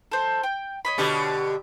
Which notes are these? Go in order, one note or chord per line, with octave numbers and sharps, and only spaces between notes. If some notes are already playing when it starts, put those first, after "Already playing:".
A4 C5
G5
C#5 D#5 B5
B2 D3 G4